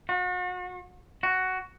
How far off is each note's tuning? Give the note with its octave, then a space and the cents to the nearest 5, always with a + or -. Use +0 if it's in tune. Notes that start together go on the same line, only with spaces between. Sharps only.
F#4 -40
F#4 +10